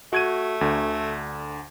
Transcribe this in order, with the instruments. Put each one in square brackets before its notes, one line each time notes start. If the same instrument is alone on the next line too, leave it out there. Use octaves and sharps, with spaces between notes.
[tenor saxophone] A3 [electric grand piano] F#4 G#6 D#7
[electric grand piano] D2 D3